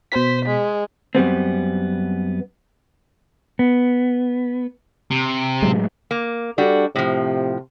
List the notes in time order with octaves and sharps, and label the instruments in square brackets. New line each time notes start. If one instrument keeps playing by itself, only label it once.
[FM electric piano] B2 B6 [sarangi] C5
[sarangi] G#3
[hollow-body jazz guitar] F#2 G3 B3 C4
[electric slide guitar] B3
[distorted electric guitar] C3
[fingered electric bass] A2 F#3 G#3
[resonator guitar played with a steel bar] A#3
[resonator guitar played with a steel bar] G3 D4 F#4 [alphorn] A4
[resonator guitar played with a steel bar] A2 F3 [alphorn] C3